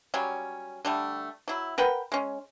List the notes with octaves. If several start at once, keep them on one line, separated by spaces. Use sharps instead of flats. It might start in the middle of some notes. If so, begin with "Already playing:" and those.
F#3 G3 C#4
D3 G3 A3
F#3 E4
A#4 B4 F#5 G5
G#3 C#4